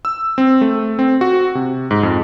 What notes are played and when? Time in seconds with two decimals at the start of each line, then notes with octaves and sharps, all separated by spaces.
0.05 E6
0.38 C4
0.61 A3
0.99 C4
1.21 F#4
1.55 C3
1.91 G#2
2.03 F2